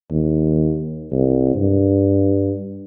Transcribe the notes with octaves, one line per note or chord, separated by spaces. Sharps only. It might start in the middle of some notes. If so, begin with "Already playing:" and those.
D#2
C2
G2